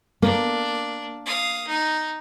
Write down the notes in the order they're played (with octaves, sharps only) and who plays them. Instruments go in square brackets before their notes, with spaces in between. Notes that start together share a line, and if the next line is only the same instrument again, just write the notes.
[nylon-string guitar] A#3 [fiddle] D4
[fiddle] F5 D#6
D#4